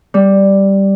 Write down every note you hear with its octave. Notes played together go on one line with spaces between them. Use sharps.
G3